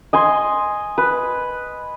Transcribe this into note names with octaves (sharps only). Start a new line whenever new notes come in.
D#5 G#5 C6
B4